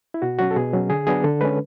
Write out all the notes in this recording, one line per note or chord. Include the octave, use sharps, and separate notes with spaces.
E4
B2 F#4
F#3 C#4 F#4
A4
B2 G#4
F#3 C#4
D3 G#4
F#3 B3 D4 G#4
D3 A4
G#3 C#4 B4